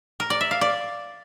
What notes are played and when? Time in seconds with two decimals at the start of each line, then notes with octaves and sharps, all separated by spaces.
0.20 A#4
0.30 D5
0.41 E5
0.51 F5
0.61 D5